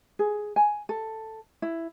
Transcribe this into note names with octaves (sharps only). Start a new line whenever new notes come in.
G#4
G#5
A4
E4